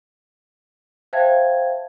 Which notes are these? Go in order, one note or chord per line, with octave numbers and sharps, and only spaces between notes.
C5 E5 F5 G5 A5 G#6